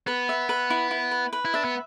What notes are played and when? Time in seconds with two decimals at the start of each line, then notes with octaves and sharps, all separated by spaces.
0.07 B3 B4
0.29 E5
0.49 B4
0.70 E4
0.91 E4
1.11 B4
1.33 B4
1.45 E4
1.54 D4 E5
1.65 B3